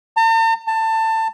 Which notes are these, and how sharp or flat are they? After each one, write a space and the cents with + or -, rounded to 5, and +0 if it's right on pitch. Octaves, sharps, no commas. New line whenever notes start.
A5 +45
A5 +20